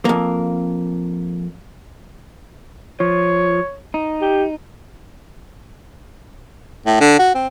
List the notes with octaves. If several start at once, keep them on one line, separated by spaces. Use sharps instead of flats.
F2 A#3
F3 C#5
D#4
G4
A2
D3
F#4
C4